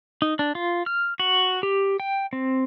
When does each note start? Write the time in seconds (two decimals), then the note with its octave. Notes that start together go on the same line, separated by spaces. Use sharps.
0.22 D#4
0.39 D4
0.55 F4
0.86 F6
1.20 F#4
1.63 G4
2.00 G5
2.33 C4